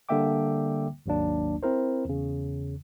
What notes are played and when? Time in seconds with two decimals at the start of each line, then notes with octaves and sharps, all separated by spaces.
0.09 D3 G3 A#3 E5 G5 D6
1.06 G#1 D#2 F#3 A#3 D4
1.63 C4 E4 A#4 C5
2.05 E2 C#3